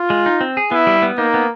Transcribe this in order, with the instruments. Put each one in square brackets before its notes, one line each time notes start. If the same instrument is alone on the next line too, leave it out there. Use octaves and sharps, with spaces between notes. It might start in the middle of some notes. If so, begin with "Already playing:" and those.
Already playing: [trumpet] F4
[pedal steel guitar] G#3
D#4
C4
G#4
[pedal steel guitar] B3 [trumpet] E4
[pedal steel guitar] G3
B3
[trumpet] A#3 [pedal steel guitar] D#4
[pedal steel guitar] B3